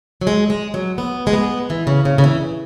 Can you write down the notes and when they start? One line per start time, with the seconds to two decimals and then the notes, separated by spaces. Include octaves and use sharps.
0.21 F#3
0.27 G#3
0.50 G#3
0.74 F#3
0.98 B3
1.27 G#3
1.33 B3
1.70 E3
1.87 C#3
2.05 C#3
2.18 C#3
2.24 E3